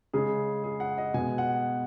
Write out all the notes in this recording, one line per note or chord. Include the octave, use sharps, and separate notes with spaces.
C#3 G#3 G#4
G#4
F#5
D#5
B2 G#3 G#5
F#5